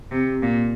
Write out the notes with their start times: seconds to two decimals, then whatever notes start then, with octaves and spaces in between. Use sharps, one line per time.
0.11 C3
0.42 A#2